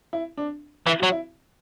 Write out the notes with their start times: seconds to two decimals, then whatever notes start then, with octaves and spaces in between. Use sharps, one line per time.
0.13 E4
0.37 D4
0.87 E3 E4
1.00 F#4
1.03 F#3
1.12 E4